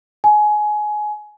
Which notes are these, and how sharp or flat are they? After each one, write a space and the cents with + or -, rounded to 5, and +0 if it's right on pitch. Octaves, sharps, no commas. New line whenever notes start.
G#5 +20